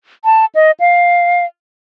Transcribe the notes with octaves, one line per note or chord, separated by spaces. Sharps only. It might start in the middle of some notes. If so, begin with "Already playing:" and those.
A5
D#5
F5